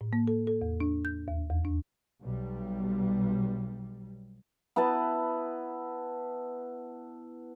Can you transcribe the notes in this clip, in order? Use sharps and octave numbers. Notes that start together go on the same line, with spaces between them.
A2
A#3
A4
A4
E2
D4
G6
D#2
E2
D4
B1 G3
B3 E4 B4 A5